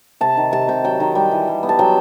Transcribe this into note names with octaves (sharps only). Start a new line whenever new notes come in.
C3 A5
D#3
C3 A5
C3 G5
F#3 G5
D#3
G3 G5
E3
G3
B3
A5
F#3 G5